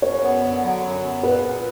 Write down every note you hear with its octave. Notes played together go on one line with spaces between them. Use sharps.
F#2 C#5
B3
D3
F#3
F#2
B3
A#2 B4
A#2